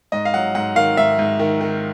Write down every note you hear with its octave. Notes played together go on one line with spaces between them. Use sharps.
G#2 D#5
F5
F#3 F#5
G#2 F#5
D#3 F5
G#2 E5
G#2
D#3
D#3